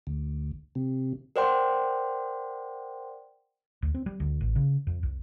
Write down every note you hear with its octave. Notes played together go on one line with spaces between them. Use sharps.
D2
C3
A#4 C5 D5 F#5 G5 C6
D2
C4
G3
D2
A1
C#3
F2
C2